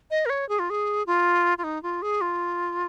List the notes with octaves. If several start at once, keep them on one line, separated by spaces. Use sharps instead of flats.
D#5
A#4
C#5
G#4
F4
G#4
F4
F4
D#4
F4
G#4
F4